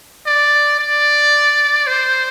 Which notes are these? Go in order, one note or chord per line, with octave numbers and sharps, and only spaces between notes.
D5
D5
C5